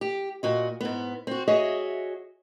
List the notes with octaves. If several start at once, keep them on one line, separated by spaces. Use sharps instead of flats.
G4
A#2 F#4 D#5
G#2 B3
C4 F#4
F#4 G#4 C#5 D#5 E5